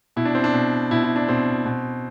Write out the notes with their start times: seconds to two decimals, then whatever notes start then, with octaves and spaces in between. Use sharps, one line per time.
0.16 B2 E4
0.25 D4
0.35 C4
0.44 D4
0.54 B2
0.91 B2 E4
1.04 E4
1.16 D4
1.28 B2 C4
1.66 B2